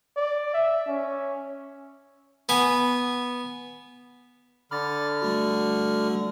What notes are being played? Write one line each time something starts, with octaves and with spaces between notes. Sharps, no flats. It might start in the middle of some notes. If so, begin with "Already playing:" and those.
D5
E5
C#4
B3 G#5
D3 B5 D6 F6 A6
G3 A3 F#4